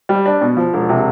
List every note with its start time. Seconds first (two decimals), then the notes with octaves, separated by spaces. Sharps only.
0.09 G3
0.26 D4
0.41 B2
0.57 F3
0.74 E1
0.89 C3